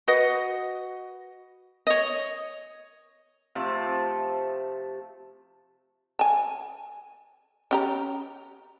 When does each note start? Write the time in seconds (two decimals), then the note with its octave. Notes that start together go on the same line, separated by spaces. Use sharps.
0.08 F#4 B4 D#5 F#5
1.87 C#5 D#5
3.55 C3 F3 A3 A5
6.19 G#5 A5
7.71 C#4 G4 A#5